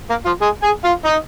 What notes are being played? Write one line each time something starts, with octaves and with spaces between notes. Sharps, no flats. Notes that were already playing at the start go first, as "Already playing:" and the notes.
A#3 A#4
F3 F4
G#3 G#4
G#4 G#5
F4 F5
D#4 D#5